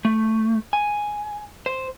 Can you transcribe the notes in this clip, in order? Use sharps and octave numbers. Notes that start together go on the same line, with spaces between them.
A3
G#5
C5